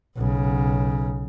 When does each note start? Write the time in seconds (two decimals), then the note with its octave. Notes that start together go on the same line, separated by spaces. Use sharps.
0.16 B1 C#3